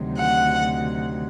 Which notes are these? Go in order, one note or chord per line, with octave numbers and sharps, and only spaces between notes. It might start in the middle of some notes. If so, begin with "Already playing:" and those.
Already playing: D2 C3 D#3 F#3
F#5